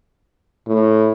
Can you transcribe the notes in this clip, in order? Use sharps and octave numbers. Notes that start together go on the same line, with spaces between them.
A2